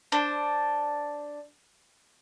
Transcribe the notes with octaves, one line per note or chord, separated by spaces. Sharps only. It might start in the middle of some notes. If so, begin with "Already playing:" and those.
D4 C5